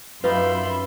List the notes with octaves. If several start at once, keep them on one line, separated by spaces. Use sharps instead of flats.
F#2 D#4 F4 G4 B4 E5 B5 C6